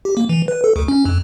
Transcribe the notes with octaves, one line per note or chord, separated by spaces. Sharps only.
G4
A#3
E3
B4
A4
D2
C#4
F2